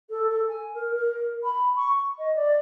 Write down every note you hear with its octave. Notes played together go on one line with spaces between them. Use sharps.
A4
A4
G#5
A#4
A#4
B5
C#6
D#5
D5